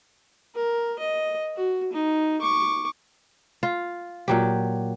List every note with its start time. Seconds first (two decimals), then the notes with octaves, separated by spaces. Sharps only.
0.55 A#4
0.99 D#5
1.56 F#4
1.93 D#4
2.41 C#6 D6
3.63 F4
4.28 A#2 F#3 G4